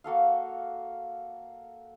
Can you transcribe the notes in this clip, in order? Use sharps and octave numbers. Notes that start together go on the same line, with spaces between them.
A#3 F#4 A4 F5